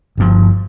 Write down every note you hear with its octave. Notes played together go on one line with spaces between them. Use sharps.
G1 G2 F3